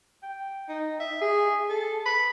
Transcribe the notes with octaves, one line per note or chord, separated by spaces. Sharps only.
G5
D#4
E5
G#4
A4
B5